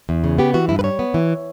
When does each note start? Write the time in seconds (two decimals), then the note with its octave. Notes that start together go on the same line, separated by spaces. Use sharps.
0.09 E2
0.24 C#3
0.38 B3 G4
0.54 E3 F#4
0.69 G2 E4
0.79 B4
0.84 G3 C#5
0.99 B3
1.14 E3